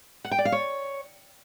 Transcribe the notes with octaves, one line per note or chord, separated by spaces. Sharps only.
F#5
G5
D5
F5
C#5